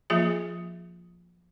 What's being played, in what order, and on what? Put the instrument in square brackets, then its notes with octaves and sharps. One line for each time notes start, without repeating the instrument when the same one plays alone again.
[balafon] F3 A#3 F4 G#4 E5